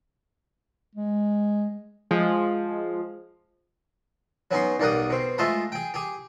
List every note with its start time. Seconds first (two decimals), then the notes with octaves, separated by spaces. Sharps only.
0.95 G#3
2.11 F3 G#3
4.51 F#3 B3 C#4 D#4 C6
4.80 B1 G3 A#3 A#4 F#5 D#6
5.10 B2 C4
5.38 G#3 A3 F4 A4 D#5 B5
5.72 G#4 G5
5.94 G4 G#4